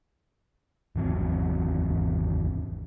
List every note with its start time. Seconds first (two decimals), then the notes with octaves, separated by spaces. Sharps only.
0.96 G#1 E2 F#3 C4